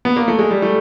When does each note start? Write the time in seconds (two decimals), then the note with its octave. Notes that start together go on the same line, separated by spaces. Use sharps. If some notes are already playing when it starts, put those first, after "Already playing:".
0.05 B3
0.16 A#3
0.28 A3
0.39 G#3
0.51 G3
0.62 A3